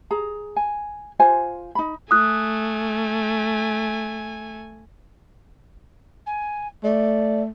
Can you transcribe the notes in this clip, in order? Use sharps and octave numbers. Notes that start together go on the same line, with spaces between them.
G#4 A#5
G#5
F4 C5 G#5
D#4 B5
A3 G#5 D#6 F#6
G#5
A3 D5